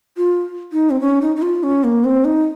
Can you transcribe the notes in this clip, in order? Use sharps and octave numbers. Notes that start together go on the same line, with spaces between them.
F4
D#4
C4
C#4
D#4
D#4
F4
C#4
A#3
C4
D#4